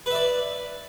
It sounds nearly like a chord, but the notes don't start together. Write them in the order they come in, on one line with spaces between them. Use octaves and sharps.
B4 E5 D5